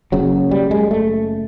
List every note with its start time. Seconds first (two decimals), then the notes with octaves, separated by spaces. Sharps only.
0.12 F#1 F#2 C#3 F#3
0.51 G3
0.71 G#3
0.91 A3